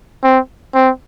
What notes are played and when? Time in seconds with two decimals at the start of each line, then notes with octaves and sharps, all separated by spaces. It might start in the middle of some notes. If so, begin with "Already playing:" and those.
0.23 C4
0.75 C4